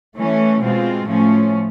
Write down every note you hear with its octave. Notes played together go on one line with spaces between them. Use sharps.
E3 A3 C#4
B2 G#3 C4 F4
A2 F3 A3 C#4